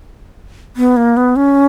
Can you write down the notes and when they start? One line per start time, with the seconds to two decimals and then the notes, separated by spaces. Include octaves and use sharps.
0.76 B3
0.97 A#3
1.17 B3
1.36 C#4